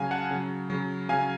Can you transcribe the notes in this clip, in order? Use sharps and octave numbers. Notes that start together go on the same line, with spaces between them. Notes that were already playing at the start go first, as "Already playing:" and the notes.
Already playing: C#3 F#3 F5 G#5
F#5 A5
C#3 F#3
C#3 F#3
C#3 F#3 F5 G#5